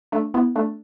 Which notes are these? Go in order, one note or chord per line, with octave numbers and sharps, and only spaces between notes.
A3 D4
B3 E4
A3 D4